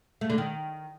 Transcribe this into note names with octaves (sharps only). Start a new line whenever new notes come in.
A3
D3
D#3